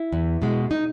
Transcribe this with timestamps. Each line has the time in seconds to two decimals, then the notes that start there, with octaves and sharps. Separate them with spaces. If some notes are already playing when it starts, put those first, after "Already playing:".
Already playing: E4
0.13 E2
0.42 B2 G#3
0.71 D#4